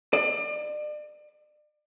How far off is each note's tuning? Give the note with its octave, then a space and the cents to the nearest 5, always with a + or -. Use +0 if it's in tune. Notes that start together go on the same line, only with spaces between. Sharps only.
D5 +35